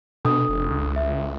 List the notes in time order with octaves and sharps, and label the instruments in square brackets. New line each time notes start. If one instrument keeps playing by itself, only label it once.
[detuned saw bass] B2 [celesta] D4 A4 D#6
[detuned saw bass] F1
C#2
[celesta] E5